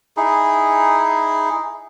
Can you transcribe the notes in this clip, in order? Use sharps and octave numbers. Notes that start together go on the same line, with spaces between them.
D#4 E4 G#4